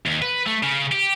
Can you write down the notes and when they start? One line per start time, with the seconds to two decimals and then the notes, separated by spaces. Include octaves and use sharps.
0.06 D#2
0.22 B4
0.46 A3
0.63 C#3
0.92 G4